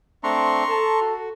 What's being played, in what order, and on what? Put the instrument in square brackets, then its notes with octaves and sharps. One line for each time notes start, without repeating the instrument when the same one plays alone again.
[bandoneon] A3 C4 D4 [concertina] A#5 C6 C#6
[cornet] A4 [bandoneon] A5
[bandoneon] F#4